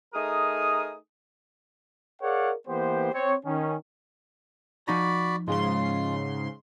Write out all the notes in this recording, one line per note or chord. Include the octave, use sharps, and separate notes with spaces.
A3 D#4 G#4 A#4 D#6
G#4 A#4 C#5 D5 F5 F#5
E3 A#3 B3 G4 C5
C4 C#5
D#3 C#4
F3 D#4 F#4 D5 A#5 B5
G#2 C#3 F4 C6